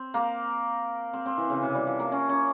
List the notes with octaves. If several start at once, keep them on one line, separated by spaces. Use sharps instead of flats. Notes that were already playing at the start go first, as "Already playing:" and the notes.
Already playing: C4
A#3
C4
C4
E3
C#3
C3
G3
F3
A#3
C#4
C#4